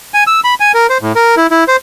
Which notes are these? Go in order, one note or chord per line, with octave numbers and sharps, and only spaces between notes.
G#5
E6
B5
G#5
A#4
C5
A2
A#4
E4
E4
C5